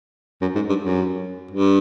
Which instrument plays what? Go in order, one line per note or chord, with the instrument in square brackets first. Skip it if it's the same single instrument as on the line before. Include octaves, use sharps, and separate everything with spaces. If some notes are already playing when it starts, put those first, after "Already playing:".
[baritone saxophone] F#2
G#2
G2
F#2
G2